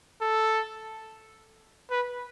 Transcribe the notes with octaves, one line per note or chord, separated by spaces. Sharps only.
A4
B4